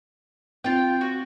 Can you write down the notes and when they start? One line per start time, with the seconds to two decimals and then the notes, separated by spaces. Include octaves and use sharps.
0.64 C4 F4 G5
1.01 F#4